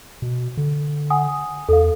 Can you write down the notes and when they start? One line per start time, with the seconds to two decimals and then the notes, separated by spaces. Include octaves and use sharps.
0.22 B2
0.57 D3
1.10 F#5 G#5 D#6
1.69 E2 A4 F5